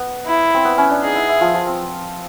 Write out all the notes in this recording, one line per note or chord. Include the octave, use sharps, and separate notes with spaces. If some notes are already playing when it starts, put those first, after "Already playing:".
Already playing: B3
E4
C4
B3
C#4
D4
D#4 G#4
E4
E4
F3 F4
F3 F4
C4